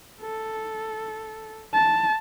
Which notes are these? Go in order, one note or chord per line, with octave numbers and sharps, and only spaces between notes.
A4
A5